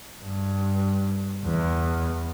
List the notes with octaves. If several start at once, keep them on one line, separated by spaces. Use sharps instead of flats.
G2
E2